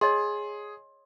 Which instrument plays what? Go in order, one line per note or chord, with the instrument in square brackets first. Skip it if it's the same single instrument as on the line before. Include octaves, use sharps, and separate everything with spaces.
[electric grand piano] G#4 [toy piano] C#5 D#5 C6